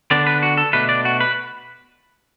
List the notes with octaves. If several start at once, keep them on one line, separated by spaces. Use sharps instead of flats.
D3 B3 D4 D5
B4
F#4
A4
B2 A3 D4 B4
D5
F#4
B4